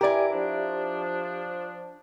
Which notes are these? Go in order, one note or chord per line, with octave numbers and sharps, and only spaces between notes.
G2 E4 G4 A#4 D5 G#5 D6
F3 D4